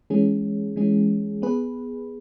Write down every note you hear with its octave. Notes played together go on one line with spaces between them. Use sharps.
E3 G#3 C#4 G#4
E3 G#3 C#4 G#4
B3 G#4 B4